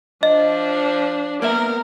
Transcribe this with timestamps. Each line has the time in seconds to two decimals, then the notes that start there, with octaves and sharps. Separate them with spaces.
0.23 F3 D4 D#5
1.42 A#3 B3 A#4 E5